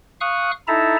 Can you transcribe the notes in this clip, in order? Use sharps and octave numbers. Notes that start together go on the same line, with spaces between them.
F5 C#6 D#6 F6 F#6
D#4 E4 A4 E5 A5 A#5